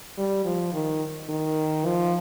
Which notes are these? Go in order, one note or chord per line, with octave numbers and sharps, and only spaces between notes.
G3
F3
D#3
D#3
F3